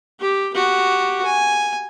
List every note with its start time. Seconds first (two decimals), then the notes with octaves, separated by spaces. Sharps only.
0.20 G4
0.54 F#4 G4
1.25 G#5